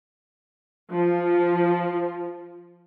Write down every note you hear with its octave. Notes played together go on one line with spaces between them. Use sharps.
F3 F4